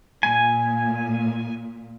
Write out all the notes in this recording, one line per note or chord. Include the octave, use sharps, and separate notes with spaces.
A#2 G#5